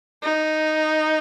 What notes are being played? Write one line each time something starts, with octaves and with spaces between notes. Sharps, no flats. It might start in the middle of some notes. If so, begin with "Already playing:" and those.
D#4